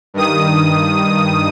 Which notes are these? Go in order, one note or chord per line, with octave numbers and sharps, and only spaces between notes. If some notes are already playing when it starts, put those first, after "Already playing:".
G2 D#3 D#6